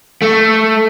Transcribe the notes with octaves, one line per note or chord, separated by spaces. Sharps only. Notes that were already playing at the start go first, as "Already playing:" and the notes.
A3